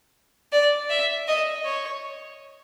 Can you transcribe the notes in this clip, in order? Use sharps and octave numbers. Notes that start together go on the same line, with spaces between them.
D5
E5
D#5
C#5